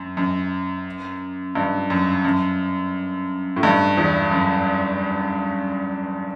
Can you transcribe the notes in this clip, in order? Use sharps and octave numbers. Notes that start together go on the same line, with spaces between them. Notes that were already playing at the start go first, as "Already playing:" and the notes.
Already playing: F#2
F#2
G2
F#2
F#2
A2
G2
E2
F#2